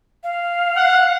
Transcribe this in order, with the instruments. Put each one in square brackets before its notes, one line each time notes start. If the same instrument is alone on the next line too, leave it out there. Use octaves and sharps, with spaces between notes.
[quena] F5
[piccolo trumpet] F#5